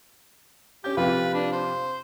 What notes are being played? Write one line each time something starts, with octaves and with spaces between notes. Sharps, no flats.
C#4 G4 G6
F2 C3 F4 B4
D4
C5